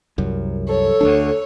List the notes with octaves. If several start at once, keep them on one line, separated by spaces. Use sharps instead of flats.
C2 F#2
A4 C#5
D2 G#3 D4